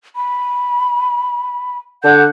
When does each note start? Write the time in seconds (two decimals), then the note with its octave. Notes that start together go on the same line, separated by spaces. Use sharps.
0.16 B5
2.04 D3 F#5 G6